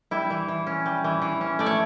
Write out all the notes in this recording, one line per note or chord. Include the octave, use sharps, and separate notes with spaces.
G3 E4
E3
E3
C#4
G3
E3
E3
C#4
A3 D5
C#5